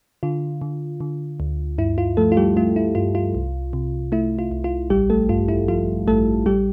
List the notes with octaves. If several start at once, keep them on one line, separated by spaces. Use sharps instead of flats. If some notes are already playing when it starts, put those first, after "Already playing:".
D3 F4
D3
D3
D2
G2 E4
F4
F3 A3 A4
F4
G3 G4
A3 F4
E4
G2 F4
F4
C2
C3
A3 E4
F4
C2
F4
A1 G3 G4
A3 A4
G2 F4
E4
F3 F4
A1 A3 A4
A1 G3 G4